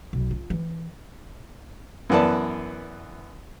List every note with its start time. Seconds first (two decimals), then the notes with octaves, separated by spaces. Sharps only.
0.13 B1
0.31 F4
0.50 E3
2.10 F#2 E3 B3 D5 A5